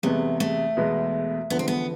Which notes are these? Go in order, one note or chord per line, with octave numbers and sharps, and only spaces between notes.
E2 C3 G#3 A3 B3
A3
E2 B2 G#3 B3
E2 D3 F3 B3
C4
B3